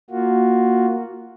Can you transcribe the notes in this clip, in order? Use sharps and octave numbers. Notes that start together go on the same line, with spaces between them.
A#3 F4 F#4